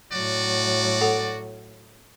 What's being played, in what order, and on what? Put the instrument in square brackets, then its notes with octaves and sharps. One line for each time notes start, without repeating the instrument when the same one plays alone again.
[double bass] A2 F#3 [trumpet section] F#4 D5
[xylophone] A4 F#5